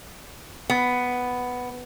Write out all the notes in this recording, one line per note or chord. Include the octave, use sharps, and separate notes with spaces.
B3